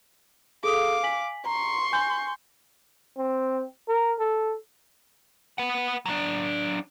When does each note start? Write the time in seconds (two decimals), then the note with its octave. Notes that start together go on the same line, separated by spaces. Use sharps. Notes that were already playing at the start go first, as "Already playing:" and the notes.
0.64 G#4 A4 F5 D6 D#6
1.03 G#5 B6 F#7
1.46 A#5 C6 C#6
1.93 G#5 G6
3.17 C4
3.89 A#4
4.19 A4
5.58 B4 F#5
6.06 F#3 D4